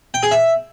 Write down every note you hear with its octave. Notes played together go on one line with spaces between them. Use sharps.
G5
G#4
E5